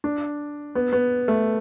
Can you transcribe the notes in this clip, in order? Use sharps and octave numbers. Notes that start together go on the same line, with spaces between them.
D4
B3
B3
A3